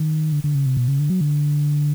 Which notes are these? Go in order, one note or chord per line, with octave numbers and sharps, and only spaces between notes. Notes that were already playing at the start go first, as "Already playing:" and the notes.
Already playing: D#3
D3
D3
C#3
C3
B2
C#3
D3
F#3
D3